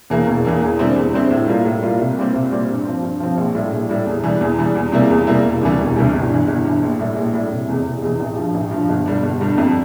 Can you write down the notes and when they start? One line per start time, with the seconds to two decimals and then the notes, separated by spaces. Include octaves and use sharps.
0.10 E2 E3 A#3
0.27 E1
0.45 E2 E3 A#3
0.62 E2
0.79 D3 G3 C4 E4
0.96 E2
1.14 D3 G3 C4 E4
1.31 A2
1.48 G3 A#3 F4
1.65 A2
1.82 G3 A#3 F4
2.00 C2
2.17 A#2 G3 C4
2.34 C2
2.51 A#2 G3 C4
2.69 G2
2.85 F3 C4
3.03 G2
3.20 F3 C4
3.37 A#1
3.55 A2 G3
3.72 A#1
3.89 A2 G3
4.07 E2
4.24 E3 G3
4.41 E2
4.58 E3 G3
4.76 E2
4.92 C3 G3 A#3 E4
5.10 E2
5.27 C3 G3 A#3 E4
5.44 E1
5.61 D2 C3 E3 G3
5.79 E1
5.96 D2 C3 E3 G3
6.13 G1
6.30 G2 E3
6.48 G1
6.65 G2 E3
6.83 A#1
6.99 A2 G3
7.16 A#1
7.34 A2 G3
7.51 F1
7.68 E2 C3 E3
7.85 F1
8.02 E2 C3 E3
8.20 A1
8.37 G2 F3
8.54 A1
8.71 G2 F3
8.89 G1
9.06 G2 D3 G3 D4
9.23 G1
9.41 G2 D3 G3 D4
9.58 F2